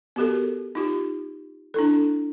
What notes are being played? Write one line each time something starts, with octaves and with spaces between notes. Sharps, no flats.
B3 F#4 G4 A4 A#4
D#4 F4 G4
D4 E4 A4